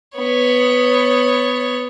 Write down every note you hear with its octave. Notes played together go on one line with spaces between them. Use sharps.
B3 C#5